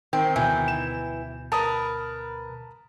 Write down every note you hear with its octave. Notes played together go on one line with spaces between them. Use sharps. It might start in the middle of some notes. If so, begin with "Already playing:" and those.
D#3 C4
D2 B2 E3 G6
E7
A#4 B4 A5 D#6